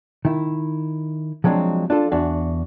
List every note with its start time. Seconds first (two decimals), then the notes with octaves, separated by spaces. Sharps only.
0.25 D#3 E4
1.44 F3 F#3 G#3 C4 D4
1.90 D4 F4 A4
2.11 E2 D4 F#4